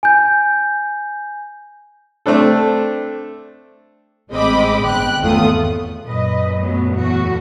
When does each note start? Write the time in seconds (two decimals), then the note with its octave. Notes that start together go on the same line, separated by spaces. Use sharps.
0.03 G#5 G6
2.26 A3 C4 D4 A4
4.31 A1 G#3 C4 D#5 B5 D6
4.83 G1 G5 F#6
5.21 G#1 E2 A3 C#4 F4 D#6
6.05 F#2 A#2 B4 D#5
6.59 F#3 A3 B3
6.92 E2 A3 F#4